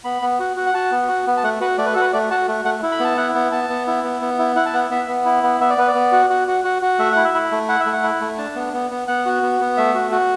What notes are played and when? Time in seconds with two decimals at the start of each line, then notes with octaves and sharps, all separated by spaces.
0.04 B3 B5
0.22 B3
0.39 F#4
0.56 F#4
0.66 F#5
0.74 F#4 A5
0.92 B3
1.08 F#4
1.27 B3
1.37 A5
1.43 A3 F#5
1.61 F#4 B4
1.78 A3 D5
1.86 B4
1.93 F#4 A4
2.01 B4
2.13 A3 D5
2.31 F#4 A5
2.48 A3
2.65 A3 F#5
2.83 E4
2.92 B5
3.00 B3 A5
3.17 E4 F#5
3.35 B3
3.52 B3 A5
3.70 B3
3.87 E4
4.04 B3
4.21 B3
4.39 E4
4.56 E4 F#5
4.66 A5
4.73 B3 F#5
4.90 B3 E5
5.08 B3
5.25 E4
5.43 B3
5.60 B3 E5
5.70 D5
5.78 B3 B4
5.88 D5
5.95 B3
6.12 F#4
6.30 F#4
6.48 F#4
6.64 F#4
6.82 F#4
6.99 A3 E5
7.12 E4 F#5
7.24 E5
7.34 E4
7.51 A3
7.69 E4 F#5
7.80 E5
7.86 A3
7.93 F#5
8.03 E4
8.21 A3
8.38 D4 A5
8.56 B3
8.73 B3
8.91 B3
9.07 B3 F#5
9.26 F#4
9.43 B3
9.60 B3
9.77 A3 E5
9.94 F#4
10.12 F#4